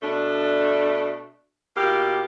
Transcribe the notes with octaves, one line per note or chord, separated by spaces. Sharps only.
B2 A3 D4
B2 A#3 F4 G4